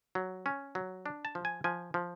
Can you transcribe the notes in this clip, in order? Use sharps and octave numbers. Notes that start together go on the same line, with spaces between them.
F#3
C#4
F#3
D4
A5
F3
G#5
F3 G#5
F3